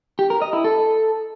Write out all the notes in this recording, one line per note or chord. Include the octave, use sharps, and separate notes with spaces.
G4
A#4
D#5
E4
A4